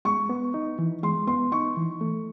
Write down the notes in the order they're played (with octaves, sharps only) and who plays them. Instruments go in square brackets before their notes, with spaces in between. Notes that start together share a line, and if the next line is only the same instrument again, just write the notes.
[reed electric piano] G#3 [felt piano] C#6
[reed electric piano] B3
D#4
E3
[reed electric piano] G#3 [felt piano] C6
[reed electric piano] B3 [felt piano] C6
[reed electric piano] D#4 [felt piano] C#6
[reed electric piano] E3
A3